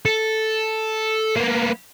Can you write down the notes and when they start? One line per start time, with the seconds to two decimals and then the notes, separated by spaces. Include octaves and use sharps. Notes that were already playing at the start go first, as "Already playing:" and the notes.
0.06 A4
1.36 A#3 B3